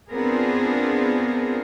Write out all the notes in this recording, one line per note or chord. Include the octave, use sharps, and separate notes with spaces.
B3 C4 D4 F4 G#4 A#4